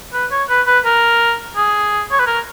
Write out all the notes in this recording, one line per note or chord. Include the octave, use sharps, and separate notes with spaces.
B4
C#5
B4
B4
A#4
G#4
C#5
B4
A#4